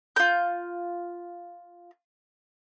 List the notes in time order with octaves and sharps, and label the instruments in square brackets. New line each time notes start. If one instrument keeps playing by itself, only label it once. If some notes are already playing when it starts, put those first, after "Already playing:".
[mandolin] F4 G6